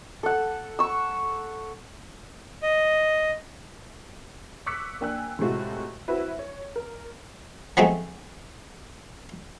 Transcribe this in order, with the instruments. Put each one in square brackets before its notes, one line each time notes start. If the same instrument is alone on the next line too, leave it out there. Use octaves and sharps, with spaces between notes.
[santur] A4 F#5
C#6 E6
[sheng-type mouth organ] D#5
[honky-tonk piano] C#6 D6 E6 F#6 B6 C#7
A#3 D4 G5 G#5 E6 F#6
A2 C3 G#3 A3 F4 F#4
C4 E4 F#4 B4 E5
C#5
A#4
[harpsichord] F3 F#3 G#3 A3 B3 C4